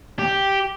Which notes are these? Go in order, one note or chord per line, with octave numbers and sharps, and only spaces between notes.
G4